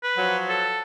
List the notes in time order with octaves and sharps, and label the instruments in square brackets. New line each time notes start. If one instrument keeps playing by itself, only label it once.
[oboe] B4
[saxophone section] F3 F#3
[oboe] A4